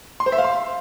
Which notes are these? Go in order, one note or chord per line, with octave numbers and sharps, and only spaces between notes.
C6
C5
E5
F5
C6